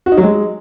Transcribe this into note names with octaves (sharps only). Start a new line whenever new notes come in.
F#4
D#4
F#3
G#3